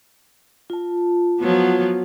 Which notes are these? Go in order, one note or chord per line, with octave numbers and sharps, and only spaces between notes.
F4 A5
F3 F#3 B3